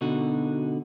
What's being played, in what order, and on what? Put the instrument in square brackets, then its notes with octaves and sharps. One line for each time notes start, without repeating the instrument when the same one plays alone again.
[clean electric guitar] B2 D3 D#4 F#4